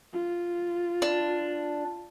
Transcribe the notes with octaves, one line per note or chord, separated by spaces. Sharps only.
F4
D4